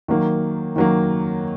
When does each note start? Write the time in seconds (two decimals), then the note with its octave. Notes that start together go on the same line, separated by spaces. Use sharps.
0.08 D#3 F#3 A#3
0.76 D#3 F#3 A#3